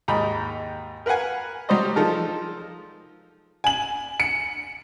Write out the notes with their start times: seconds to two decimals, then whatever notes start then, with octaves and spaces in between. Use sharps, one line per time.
0.08 D#2 G#2 B5 D#6
1.06 A#4 B4 F5 F#5 G#5
1.69 F#3 G3 G4 C5 D5 D#5
1.96 F3 G#3 D#4 A4 A#4
3.64 G#5 F#7
4.20 C#7